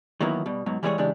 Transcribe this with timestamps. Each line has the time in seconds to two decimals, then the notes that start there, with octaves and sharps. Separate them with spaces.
0.20 D#3 E3 F#3 A#3 B3 E4
0.46 B2 G3
0.66 G#2 B2 F#3
0.83 E3 G3 G#3 B3 G#4 C#5
0.98 C#3 E3 G#3 D4 G4